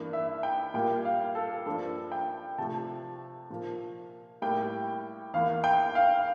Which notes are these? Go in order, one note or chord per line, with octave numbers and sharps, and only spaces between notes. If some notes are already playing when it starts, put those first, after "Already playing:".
Already playing: G2 E3 A#3
E5
G5
A#2 G3 A#3 G5
F5
A4
G2 F3 A#3 A4
G5
C3 F3 A3 A5
A#2 F3 A#3
A2 G3 A#3 G5
E2 E3 A#3 F5
G5
F5